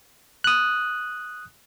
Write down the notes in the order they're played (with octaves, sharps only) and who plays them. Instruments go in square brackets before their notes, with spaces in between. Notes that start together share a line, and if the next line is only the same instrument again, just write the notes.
[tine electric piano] D#6 F#6